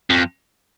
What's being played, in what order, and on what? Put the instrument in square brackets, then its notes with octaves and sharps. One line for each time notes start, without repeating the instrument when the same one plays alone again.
[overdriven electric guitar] F2